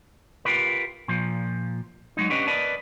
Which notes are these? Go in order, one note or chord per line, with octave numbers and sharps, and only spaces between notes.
F4 G4 A#4 B4
A#2 F3
F#3 G#3 D#4
B3 C#4 D4 G4 B4 D#5
A#4 B4 D5 D#5 A5